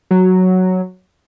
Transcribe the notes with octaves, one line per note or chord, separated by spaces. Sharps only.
F#3